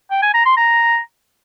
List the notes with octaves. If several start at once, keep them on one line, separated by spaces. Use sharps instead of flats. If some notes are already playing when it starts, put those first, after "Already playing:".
G5
G#5
A#5
C6
A#5